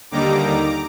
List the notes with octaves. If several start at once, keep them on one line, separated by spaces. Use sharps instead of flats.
D#2 D3 G3 A#3 D#4 A#5 D6